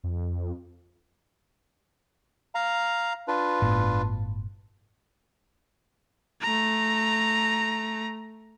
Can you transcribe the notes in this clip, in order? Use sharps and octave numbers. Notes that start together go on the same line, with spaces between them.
F2
F5 A#5
D4 F4 B4
G1 A2 B3
A3 A#5